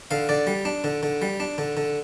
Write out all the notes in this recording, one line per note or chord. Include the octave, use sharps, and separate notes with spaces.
D3 F5
D3 D5
G3
D4
D3
D3
G3
D4
D3
D3